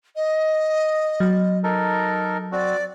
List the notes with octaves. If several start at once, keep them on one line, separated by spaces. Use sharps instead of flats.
D#5
F#3
D#4 A4 A#4
C4 F#4 D5